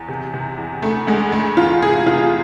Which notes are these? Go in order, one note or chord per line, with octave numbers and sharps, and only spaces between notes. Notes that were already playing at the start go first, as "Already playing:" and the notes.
Already playing: E2
C3
C3
E2
D2 A3
D2 G#3
D2 A3
E2 F4
C3 G#4
C3 F4